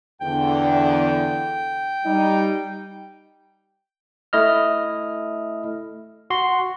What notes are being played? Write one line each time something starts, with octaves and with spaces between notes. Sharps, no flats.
E2 D3 G5
G3 D#4
A3 E4 D#5 F6
F#4 C6